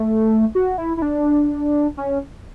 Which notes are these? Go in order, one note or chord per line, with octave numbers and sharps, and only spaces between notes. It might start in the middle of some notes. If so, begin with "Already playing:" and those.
Already playing: A3
F#4
E4
E4
D4
C#4